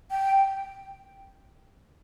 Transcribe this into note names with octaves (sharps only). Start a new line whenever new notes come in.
G5